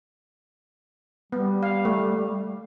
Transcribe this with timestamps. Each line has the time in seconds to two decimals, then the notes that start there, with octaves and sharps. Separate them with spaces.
1.32 G3 B3
1.63 F5
1.85 A3